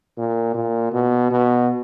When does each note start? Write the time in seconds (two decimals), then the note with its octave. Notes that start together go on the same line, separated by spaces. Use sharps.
0.17 A#2
0.54 A#2
0.92 B2
1.30 B2